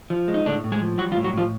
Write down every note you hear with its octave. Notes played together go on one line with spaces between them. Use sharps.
F3
G#3
D#4
A2 D3 D4
A2
G#3 G#4
F3
F#3 G3 F#4
F3 F4
A2
F#3 F#4
A2 F3 F4